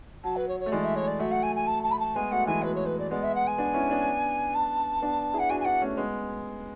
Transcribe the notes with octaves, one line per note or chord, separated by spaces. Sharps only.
F#3 A5
B4
C#5
C#5
A3
E3 G#3 D5
E5
C#5
D5
F#3 A3 E5
F#5
G#5
G#5
A5
A5
B5
A5
G#3 B3 G#5
F#3 A3 F#5
E3 G#3 G#5
F#3 A3 B4
C#5
B4
D5
G#3 B3 D5
E5
F#5
G#5
B3 D4
C#4 E4
B3 D4
A5
B3 D4
E4 G#4
F#5
D4 F#4 G#5
G#5
B3 D4 F#5
A3 C#4
G#3 B3